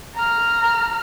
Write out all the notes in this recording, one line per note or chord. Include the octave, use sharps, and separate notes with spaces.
A#5 F6